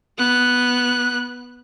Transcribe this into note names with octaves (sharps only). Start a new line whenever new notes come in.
B3 F#6